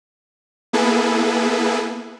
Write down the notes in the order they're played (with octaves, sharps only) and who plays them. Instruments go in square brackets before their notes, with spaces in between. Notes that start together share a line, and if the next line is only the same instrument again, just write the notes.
[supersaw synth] A#3 B3 E4 G#4 A4 B4